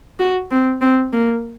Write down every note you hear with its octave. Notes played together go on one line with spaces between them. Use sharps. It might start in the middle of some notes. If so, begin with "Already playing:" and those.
F#4
C4
C4
A#3